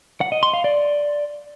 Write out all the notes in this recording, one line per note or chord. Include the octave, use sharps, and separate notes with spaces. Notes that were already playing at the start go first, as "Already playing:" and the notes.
F#5
D#5
C6
F5
D5